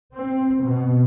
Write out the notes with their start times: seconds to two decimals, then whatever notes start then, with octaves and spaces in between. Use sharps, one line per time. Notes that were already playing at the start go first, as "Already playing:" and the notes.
0.15 C4
0.63 B2